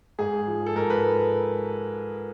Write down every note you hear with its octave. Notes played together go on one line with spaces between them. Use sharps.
G#2 G#4
F3
A4
G#2 A#4
B4